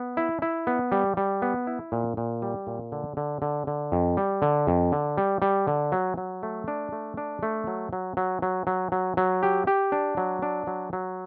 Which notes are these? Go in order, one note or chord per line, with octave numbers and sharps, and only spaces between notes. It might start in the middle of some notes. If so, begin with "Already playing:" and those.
Already playing: B3
E4
E4
B3
G3
G3
B3
E4
A#2
A#2
G3
A#2
D3
D3
D3
D3
F2
G3
D3
F2
D3
G3
G3
D3
F#3
F#3
A3
D4
A3
D4
A3
F#3
F#3
F#3
F#3
F#3
F#3
F#3
G4
G4
D4
F#3
D4
F#3
F#3